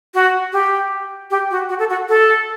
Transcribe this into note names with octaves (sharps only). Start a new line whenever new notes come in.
F#4
G4
G4
F#4
F#4
A4
F#4
A4